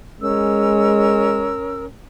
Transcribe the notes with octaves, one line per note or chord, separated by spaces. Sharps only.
G#3 C#4 A#4 E6